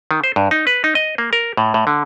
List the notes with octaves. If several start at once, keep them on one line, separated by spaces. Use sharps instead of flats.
D#3
C5
G2
D#4
B4
D#4
D#5
A#3
A#4
A2
A2
D3